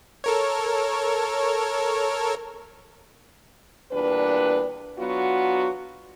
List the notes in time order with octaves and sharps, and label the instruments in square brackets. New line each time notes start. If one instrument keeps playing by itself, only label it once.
[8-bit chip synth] A4 A#4 C#5
[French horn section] E2 A#2 G3 D4 B4
F#3 B3 D4 F4 F#4